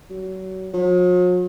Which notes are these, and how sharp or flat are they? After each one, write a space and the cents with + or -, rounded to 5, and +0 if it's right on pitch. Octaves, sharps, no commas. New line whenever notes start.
F#3 +30
F#3 -45